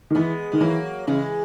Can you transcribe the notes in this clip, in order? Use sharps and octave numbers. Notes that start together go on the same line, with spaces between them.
D#3
E3 G#3 B3
D#3 G#3
E3 F#3 A#3
C#3 E3 G#3